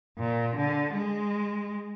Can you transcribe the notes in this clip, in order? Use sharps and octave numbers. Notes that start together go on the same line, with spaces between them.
A#2
D3
G#3